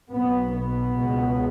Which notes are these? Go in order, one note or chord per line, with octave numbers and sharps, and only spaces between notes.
B1 B2 B3
B3
C#2 B2